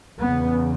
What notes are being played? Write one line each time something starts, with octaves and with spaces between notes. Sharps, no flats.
E2 C#3 B3